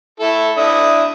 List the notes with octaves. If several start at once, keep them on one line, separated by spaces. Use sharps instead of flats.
E4 A4
D4 E4 D#6